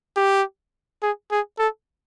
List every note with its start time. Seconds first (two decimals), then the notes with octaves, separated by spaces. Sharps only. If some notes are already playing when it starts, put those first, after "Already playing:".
0.17 G4
1.02 G#4
1.32 G#4
1.59 A4